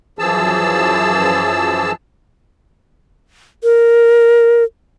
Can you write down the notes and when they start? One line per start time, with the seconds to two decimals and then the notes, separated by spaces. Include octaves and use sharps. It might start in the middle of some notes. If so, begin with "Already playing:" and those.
0.19 F#2 E3 F3 G#4 A5 E6
3.64 A#4